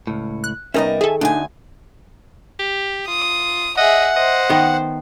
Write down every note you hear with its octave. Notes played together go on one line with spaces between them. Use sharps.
C#2 A2
F#6
C2 G3 B3 C#4 D#4 A#4 D#5 E5
D#3 G#4 A4 E5 G#5
D2 D4 D#4 G#5
G4
F4 D#6
G#4 D#5 E5 F#5
C5 D#5
D#3 B3